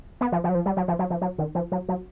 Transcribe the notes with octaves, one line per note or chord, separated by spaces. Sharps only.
B3
F3
F3
F#3
F3
G3
F#3
F3
F#3
F3
F#3
D#3
F3
F#3
F#3